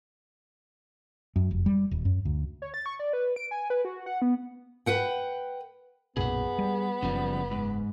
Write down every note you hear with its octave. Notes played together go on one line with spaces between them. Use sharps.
F#2
F1
G3
D#1
F#2
D2
C#5
A6
C#6
D5
B4
D7
G#5
B4
F#4
F#5
B3
B4 F#5 G5
B1 F#2 A#2 B3 G#4 F#5
G3
F#1 C#3 F3 G3
G#2